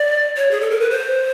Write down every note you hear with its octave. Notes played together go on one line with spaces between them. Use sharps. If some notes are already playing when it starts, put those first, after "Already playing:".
Already playing: D5
C#5
G#4
A4
A#4
B4
C5